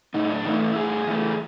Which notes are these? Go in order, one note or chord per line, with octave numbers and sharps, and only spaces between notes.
A2 D#4
D4
E3 A3 D#4
E4
A2 G#4
E3 A3